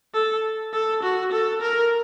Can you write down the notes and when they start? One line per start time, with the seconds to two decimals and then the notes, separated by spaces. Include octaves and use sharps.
0.14 A4
0.73 A4
1.03 F#4
1.32 A4
1.62 A#4